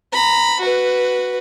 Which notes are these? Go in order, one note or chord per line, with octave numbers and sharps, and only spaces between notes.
A#5 B5
F#4 B4